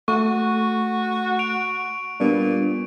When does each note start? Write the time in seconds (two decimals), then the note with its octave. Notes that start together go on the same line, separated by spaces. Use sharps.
0.08 A3 F#4 C#6
1.39 D7 F7
2.20 A#2 G3 B3 D4